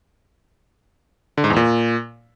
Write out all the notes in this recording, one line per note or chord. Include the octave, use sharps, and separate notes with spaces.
D3
G#2
E2
A#2